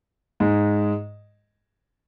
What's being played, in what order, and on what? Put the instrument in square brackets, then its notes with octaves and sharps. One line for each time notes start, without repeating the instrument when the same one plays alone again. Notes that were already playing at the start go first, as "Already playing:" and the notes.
[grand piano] G#2 G#3